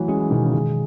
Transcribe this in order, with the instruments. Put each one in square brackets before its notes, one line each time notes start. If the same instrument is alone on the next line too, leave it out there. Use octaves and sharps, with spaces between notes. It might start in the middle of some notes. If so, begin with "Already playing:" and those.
Already playing: [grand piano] E3 F#3 [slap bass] A3
[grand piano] G#3 [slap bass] C#4
[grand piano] E3
[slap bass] B2 [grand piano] D#3
[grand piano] C#3
[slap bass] D#3 [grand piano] G#3